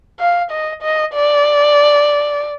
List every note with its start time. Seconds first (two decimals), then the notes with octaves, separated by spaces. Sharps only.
0.20 F5
0.51 D#5
0.82 D#5
1.14 D5